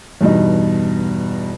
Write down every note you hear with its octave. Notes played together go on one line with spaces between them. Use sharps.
E2 G2 B2 D#4